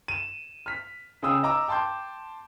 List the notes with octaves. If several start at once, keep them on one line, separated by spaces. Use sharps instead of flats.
D#7 E7
F6 B6
C#3 G#4 G5 D#6 E6
D#5 A#5 D6 E6
G5 A5 C6 D6 G6